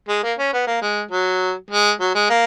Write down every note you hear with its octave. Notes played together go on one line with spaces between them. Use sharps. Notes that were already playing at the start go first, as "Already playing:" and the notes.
G#3
A#3
C#4
B3
A#3
G#3
F#3
G#3
F#3
G#3
A#3